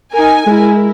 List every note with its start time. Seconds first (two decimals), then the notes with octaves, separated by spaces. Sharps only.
0.14 D#4 A#4 G#5
0.47 G#3 E4 A#4